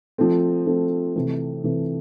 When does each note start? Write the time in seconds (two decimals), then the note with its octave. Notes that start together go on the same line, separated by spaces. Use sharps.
0.18 F3 A3 C4
0.67 F3 A3 C4
1.16 C3 E3 A3
1.64 C3 E3 A3